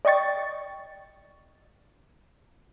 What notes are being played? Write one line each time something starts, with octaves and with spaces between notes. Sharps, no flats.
D5 D#5 G5 C#6 A6